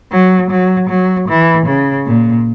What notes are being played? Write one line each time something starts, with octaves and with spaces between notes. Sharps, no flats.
F#3
F#3
F#3
E3
C#3
A#2